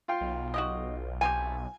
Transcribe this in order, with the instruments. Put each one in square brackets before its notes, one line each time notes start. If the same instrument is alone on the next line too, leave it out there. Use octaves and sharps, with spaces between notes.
[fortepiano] F4 F5 G5
[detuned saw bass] B1
[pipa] F#4 G4 D#5
[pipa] A3 C4 G4 [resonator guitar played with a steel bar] G#5